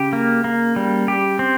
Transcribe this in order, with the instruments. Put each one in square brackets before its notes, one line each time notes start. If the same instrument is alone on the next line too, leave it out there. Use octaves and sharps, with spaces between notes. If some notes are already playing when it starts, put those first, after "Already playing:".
Already playing: [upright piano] C#3 [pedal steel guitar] G4
[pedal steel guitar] A#3
A#3
G3
G4
C4